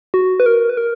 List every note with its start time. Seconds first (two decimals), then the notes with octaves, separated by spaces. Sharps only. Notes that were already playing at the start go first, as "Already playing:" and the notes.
0.14 F#4
0.40 B4
0.46 A#4
0.69 B4
0.77 A#4